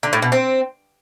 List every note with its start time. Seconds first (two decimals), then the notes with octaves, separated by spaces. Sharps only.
0.03 D3
0.13 A2
0.22 B2
0.32 C4